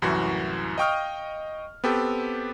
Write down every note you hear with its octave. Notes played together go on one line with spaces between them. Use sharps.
C2 F#2 A2 E3 F#4
D#5 F5 G5 C#6 D#6 F6
B3 C4 G4 A4